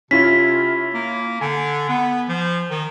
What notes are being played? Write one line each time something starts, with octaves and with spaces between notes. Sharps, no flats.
C3 C#4 E4 F4 B6
A#3
D3 G#5
B3
F3
D#3